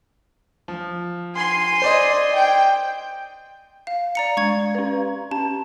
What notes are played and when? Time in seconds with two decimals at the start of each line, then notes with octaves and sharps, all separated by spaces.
0.68 F3
1.35 G#5 C6
1.82 C5 D5 D#5
2.35 G5
3.87 F5
4.15 D5 A#5 C#7
4.37 G#3 C#6 G#6
4.75 C#4 B4
5.31 C#4 A5